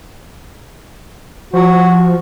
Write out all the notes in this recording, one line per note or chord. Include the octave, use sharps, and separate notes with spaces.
F3 F#4